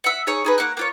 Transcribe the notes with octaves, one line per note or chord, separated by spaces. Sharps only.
E5 F#5
D#4 G#4 C#5
D#4 G#4 B4
A#3 C#5 F#5 F#6
A#3 F4 C#5